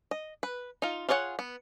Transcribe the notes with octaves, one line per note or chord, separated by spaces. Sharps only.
D#5
B4
D#4 F4
F4 G#4 C#5 D5 F#5
B3